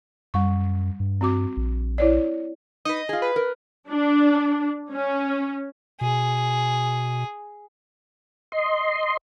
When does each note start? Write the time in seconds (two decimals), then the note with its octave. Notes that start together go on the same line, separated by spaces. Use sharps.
0.34 F#2 G3 C#6
1.00 G2
1.21 C4 F#4 D6
1.57 A#1
1.98 E4 C#5 D5
2.85 D#4 B4 D#5
3.09 F4 G#4
3.22 B4
3.36 A#4
3.89 D4
4.92 C#4
6.01 B2 G#4
8.52 D#5 C6